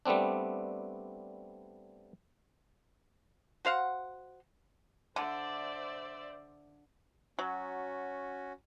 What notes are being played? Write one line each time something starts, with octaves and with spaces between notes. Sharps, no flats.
G3 A3 B3 C4 D4
F#4 C5 F5 F#5
D3 C5 D5 E5
F#3 C#4 F#4